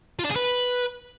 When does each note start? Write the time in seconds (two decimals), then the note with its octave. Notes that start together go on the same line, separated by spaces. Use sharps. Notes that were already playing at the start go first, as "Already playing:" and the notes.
0.19 F4
0.25 D4
0.30 G#4
0.36 B4